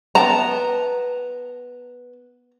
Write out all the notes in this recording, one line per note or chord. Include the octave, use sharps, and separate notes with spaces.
B3 G5 A5 A#5